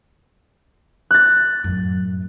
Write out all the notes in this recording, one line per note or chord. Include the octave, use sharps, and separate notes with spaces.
F#6 A6
F#2 A2